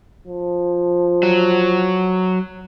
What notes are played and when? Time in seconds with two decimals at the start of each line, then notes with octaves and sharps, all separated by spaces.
0.27 F3
1.23 F#3